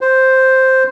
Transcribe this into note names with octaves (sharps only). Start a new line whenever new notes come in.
C5